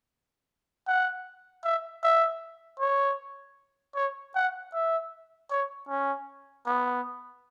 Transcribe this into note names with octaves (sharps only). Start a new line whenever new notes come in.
F#5
E5
E5
C#5
C#5
F#5
E5
C#5
C#4
B3